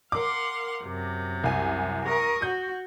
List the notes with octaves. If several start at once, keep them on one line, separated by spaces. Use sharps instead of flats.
A#4 F5 F#5 C6 D6
F#2 C3
C2 G#5
A#4 C#6 D#6
F#4 G6